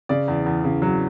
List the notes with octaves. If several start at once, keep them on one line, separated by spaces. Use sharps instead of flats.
C#3 D5
E2
E2
C#3
F#3